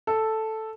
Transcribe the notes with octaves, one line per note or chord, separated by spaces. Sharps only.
A4